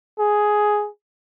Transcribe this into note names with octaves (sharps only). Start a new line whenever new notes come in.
G#4